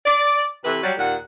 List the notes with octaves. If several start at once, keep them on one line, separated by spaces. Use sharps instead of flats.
D5
C3 E3 A4 B4
F#3 G3
D#2 A#2 F#5